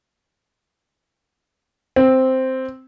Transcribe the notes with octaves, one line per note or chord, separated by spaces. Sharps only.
C4